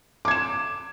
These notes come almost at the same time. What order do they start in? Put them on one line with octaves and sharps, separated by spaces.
D6 G#6 E7